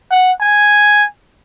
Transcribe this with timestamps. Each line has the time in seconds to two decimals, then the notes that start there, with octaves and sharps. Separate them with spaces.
0.11 F#5
0.41 G#5